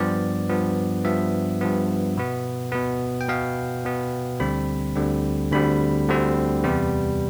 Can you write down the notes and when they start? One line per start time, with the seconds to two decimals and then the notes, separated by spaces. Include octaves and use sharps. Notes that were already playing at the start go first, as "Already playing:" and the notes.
Already playing: G2 F3 B3 D5
0.50 G2 F3 B3
1.04 G2 F3 B3 E5
1.61 G2 F3 B3
2.17 B2 B3
2.72 B2 B3
3.21 G5
3.28 B2 B3 F5
3.85 B2 B3
4.40 D2 D3 G3 C4 B5
4.96 D2 D3 G3 C4
5.52 D2 D3 G3 C4 B5
6.08 D2 D3 G3 C4
6.64 E2 C3 G3 B3